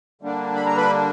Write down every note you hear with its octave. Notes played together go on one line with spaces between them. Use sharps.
D3 G3 A#3 D4
B5
A#5
B4 B5